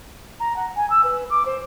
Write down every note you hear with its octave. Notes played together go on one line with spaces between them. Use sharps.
A#5
F#5
G#5
E6
B4
D6
C5